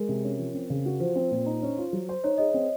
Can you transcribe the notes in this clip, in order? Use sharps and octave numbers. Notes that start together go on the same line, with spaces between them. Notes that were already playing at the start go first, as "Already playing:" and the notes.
Already playing: G#3 A#4
C3
C#4
F3
C4
C#3
F#4
F3 C5
C4
A#2
D#4
C#4
F4
F#3
C5
D#4 C#5
G#4 D#5
C4 C#5